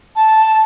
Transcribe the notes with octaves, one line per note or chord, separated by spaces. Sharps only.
A5